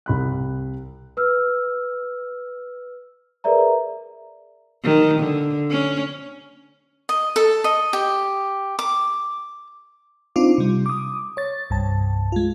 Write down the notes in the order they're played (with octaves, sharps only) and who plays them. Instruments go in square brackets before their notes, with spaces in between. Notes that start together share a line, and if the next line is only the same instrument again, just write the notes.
[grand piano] C2 B5 F#6
[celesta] B4 E6 F6
G#4 A#4 B4 D5 E5 A#5
[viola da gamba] D#3
D3
C#4
[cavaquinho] D#5
A4
D#5
G4
D6
[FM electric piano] C4 D4 D#4 F4 D6
C3 G3
D6 D#6
C#5 A6
C2 G2 A5
G#3 F4